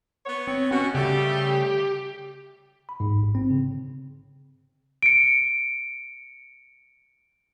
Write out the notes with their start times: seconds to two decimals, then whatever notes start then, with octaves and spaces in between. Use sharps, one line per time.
0.24 B3 C#5
0.48 C4
0.71 B2 C#4 F#4
0.95 C#3 G3 A3 G4
2.89 B5
3.00 G#2
3.16 A1
3.35 C4
3.50 C#3
5.03 C#7 D7